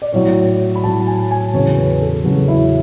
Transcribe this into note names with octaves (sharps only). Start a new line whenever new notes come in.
D5
A2 F#3 C#5
B5
A2 F#3 A5
G#5
G#5
E2 C#3 F#3 C#5
B4
A4
E2 C#3 F#3 F#4
E4